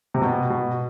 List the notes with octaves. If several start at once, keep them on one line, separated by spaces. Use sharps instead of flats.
C3
B2
B2